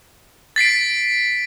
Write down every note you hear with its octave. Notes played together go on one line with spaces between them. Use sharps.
A6 B6 C7 D7